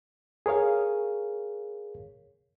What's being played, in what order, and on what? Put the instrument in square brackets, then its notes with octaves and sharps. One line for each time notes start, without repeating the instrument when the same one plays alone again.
[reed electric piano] G#4 A#4 C#5 F5